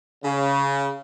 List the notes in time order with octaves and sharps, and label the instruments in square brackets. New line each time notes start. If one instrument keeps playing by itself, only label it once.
[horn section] C#3